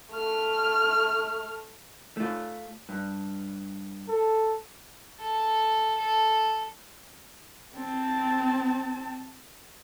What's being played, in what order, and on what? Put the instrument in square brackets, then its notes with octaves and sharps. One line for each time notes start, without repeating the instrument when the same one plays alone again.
[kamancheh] A3 F6
[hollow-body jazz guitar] A3 F4
G2
[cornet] A4
[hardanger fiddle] A4
A4
[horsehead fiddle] C4 A5